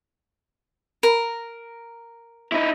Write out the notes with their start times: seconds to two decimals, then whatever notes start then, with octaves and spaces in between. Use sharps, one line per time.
1.03 A#4
2.52 D#4 E4